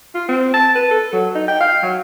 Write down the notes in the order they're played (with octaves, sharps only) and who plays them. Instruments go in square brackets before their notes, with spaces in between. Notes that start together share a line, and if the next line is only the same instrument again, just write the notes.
[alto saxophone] F4
C4
A5
B4
A4
F#3
D#4
G5
F5
F#3